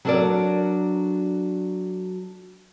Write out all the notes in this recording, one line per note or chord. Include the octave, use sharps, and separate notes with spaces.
F#3 D4 F#4 A4 A#4 D5